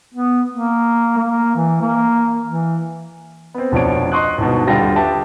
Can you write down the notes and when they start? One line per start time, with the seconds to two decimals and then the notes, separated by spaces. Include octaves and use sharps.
0.14 B3
0.51 A#3
1.17 A#3
1.55 E3
1.81 A#3
2.47 E3
3.54 B3 C4
3.72 F1 B2 F3 D4 C#5 D7
4.12 D#5 C6 C#6 D#6 F#6
4.38 G1 G#2 B2
4.67 D#1 D3 G3 F4 G5 A#6
4.96 G4 B4 E5 A5